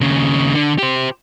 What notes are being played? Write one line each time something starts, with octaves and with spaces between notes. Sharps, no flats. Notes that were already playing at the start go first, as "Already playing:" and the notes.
D#2 C#3
D3
G4 C5